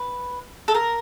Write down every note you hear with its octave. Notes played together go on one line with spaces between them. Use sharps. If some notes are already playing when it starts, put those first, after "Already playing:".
Already playing: B4
A4
A#4